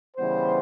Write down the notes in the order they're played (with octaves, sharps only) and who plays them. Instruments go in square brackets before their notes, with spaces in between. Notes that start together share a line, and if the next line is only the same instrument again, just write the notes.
[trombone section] C#3 E3 G3 B3 C5